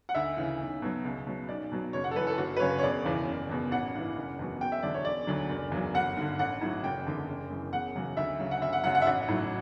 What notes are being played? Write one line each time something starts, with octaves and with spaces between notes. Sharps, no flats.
F#5
D2 E5
C#3 E3
B1
B2 F#3
C#2
B2 F#3
B1 D5
B2 F#3
F#1 C#5
F#5
A4
F#2 E3 B4
A4
G1 F#4
B4
F#2 C#3 C#5
C#5
E1 D5
E2 C#3 E3
F#1
E2 B2
A1 F#5
G2 E3
F#1
E2 B2 F#3
E1 G5
E5
E2 D3 F#3 D5
C#5
E1 D5
D2 D3 F#3
F#1
E2 C#3 F#3
G1 F#5
G2 D3
A1 F#5
A2 F#3
F#1 G5
E2 D3
F#1
F#2 E3
E1 F#5
E2 C#3 F#3
D2 E5
C#3 F#3
F#5
G1 E5
F#5
F#2 C#3 F#3 F#5
F#5
E5
A1 F#5
A2 F#3